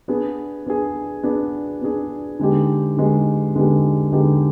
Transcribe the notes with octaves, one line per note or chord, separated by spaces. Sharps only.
B3 D4 G#4
B3 D4 G#4
B3 D4 G#4
B3 D4 G#4
D3 G#3 B3 D#4 G4
D3 G#3 B3 D#4 G4
D3 G#3 B3 D#4 G4
D3 G#3 B3 D#4 G4